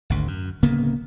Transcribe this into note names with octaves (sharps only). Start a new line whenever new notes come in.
G#1 D2
F#2
D1 C#3 A#3 B3